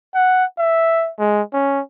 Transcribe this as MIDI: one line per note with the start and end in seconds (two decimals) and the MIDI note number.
0.15 0.45 78
0.58 1.11 76
1.19 1.42 56
1.53 1.81 61